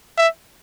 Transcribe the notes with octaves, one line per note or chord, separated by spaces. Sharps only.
E5